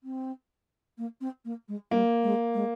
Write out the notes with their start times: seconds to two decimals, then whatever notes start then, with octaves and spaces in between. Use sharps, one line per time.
0.03 C4
0.97 A#3
1.21 C4
1.45 A#3
1.68 G#3
1.91 G3 A#3
2.23 G#3
2.54 G#3